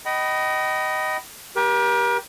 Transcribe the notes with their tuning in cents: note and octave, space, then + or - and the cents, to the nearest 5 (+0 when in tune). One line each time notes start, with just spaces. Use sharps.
D#5 +0 G5 -45 B5 +0
G4 +0 A#4 +40